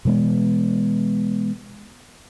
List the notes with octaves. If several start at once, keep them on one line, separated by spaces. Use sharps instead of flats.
B2 E3 G#3 B3